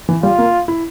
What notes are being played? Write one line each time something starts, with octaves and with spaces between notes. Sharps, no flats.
E3
G3 F4
A#3
E4